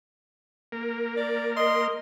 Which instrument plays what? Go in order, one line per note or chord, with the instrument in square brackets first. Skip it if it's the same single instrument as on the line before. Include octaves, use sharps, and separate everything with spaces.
[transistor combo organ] A#3 A#4
[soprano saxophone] D5
[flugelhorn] D#5 [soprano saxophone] C6